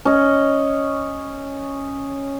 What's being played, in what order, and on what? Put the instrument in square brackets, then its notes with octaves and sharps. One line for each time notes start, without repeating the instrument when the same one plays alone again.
[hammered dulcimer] C#4 D#5